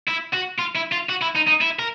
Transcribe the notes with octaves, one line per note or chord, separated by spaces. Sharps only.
E4
F#4
F4
E4
F4
F#4
E4
D#4
D#4
E4
A#4